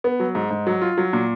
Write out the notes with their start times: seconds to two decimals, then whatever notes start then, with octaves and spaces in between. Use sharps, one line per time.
0.04 B3
0.20 F#3
0.35 G#2
0.50 G#2
0.67 F#3
0.82 F4
0.97 F#3
1.13 A#2